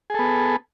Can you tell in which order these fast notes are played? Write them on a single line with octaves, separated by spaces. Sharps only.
G#4 A4 B3